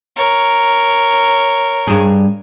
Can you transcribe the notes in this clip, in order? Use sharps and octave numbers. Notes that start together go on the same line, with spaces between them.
A#4 C#5
G2 G#4